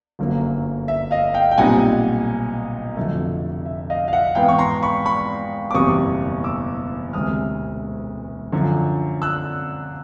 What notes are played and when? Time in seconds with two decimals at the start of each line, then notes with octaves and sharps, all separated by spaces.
0.19 G1 F#2 D3 F#3 A#3
0.88 E5
1.11 D#5 F5
1.34 F5 G5
1.51 G5
1.57 B1 A#2 G3 C4 D#4 F#5 G#5
2.96 F1 F2 D3 F#3 A3
3.66 E5
3.90 D#5 F5
4.08 F5
4.13 E5 F#5
4.35 G#2 E3 G#3 B3 F5 G5
4.48 C#6
4.58 A#5 C6
4.82 B5 C#6
5.05 B5 C#6
5.71 D6
5.74 F#1 E2 B2 G3 C4 C#6 D#6
6.44 D6 E6
7.13 E1 D2 C3 E3 G#3 D#6 F6
8.52 F#2 D3 F3
9.22 E6 F#6